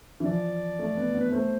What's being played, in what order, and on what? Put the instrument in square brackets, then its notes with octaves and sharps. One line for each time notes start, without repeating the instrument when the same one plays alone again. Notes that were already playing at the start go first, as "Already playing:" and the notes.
[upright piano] E3
[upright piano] F3 [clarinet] D5
[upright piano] A3
B3
B3
[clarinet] B4
[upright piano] A3 [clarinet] C5